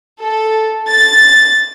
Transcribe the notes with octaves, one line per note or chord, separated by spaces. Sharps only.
A4
A6